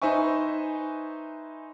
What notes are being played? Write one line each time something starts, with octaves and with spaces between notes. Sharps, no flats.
D#4 B4 C5 E5 G#5 C#6